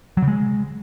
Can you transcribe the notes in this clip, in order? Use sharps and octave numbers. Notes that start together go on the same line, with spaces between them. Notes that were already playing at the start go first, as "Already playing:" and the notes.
F#3
C#3
G#3